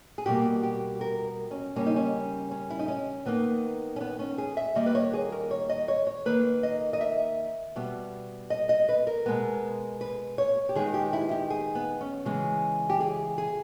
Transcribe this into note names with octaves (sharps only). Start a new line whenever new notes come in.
G#4
B2 G3 A#3 G4
G4
A#4
C#4
C#3 G3 A#3 C#4
D#4
C#4
C#4
E4
D#4
C#4
D#3 A#3 B3
C#4
B3
C#4
G#4
E5
D#3 G3 A#3 D#5
B4
C#5
G#4
A#4
C#5
D#5
C#5
C#5
D#3 A#3 B4
D#5
D#5
E5
B2 G3 B3
D#5
D#5
B4
A#4
B2 G#3 B3
B4
C#5
G4
D#3 G#3 B3 G#4
G4
E4
G4
G#4
B3
C#4
C#3 E3 G#3 B3
G4
G#4
G#4